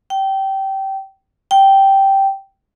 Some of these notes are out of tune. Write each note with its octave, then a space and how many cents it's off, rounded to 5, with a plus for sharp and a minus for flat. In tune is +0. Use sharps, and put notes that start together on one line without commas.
G5 -20
G5 -5